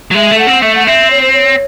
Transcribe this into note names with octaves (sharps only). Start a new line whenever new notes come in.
F#3
G#3 E5
A3
F#5
C4
A3 E5
F#5
C4 E5
C#5
C5
C#5